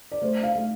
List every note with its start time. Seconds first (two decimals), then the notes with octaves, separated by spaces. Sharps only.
0.12 D5
0.22 A3 C5
0.43 F5
0.55 A3